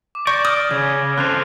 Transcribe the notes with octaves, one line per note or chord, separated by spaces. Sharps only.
D6
D5 C#6 G6 A#6
D#6 F6
C#3 G#6
C4 A4 C5 F#6 G6 F7